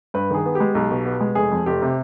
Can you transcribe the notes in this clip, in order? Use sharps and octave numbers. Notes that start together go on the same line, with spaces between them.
G2 B4
D#3 G#4
B3
G#3 G4
B1
B2
B3
G#3
F1 G#4
F2
F1 G4
C3